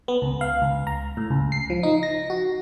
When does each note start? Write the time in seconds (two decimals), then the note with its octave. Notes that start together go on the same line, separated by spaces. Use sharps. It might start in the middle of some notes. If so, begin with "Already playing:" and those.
0.08 B3
0.22 C#2
0.41 F5
0.62 C#2
0.87 A#5
1.17 A2
1.30 C#2
1.52 C7
1.70 F3
1.83 D#4
2.03 A#6
2.30 F#4